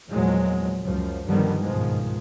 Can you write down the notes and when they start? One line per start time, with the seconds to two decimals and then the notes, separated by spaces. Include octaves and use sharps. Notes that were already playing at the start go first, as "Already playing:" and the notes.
0.10 E2 A#2 F3 F#3 G#3
0.83 C#2 F#2 F3
1.26 G2 D3 D#3 F3 G3 B3
1.61 C#2 G#2 B2 D#3 F3 G#3